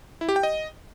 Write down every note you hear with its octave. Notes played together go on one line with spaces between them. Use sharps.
E4
G4
G5
D#5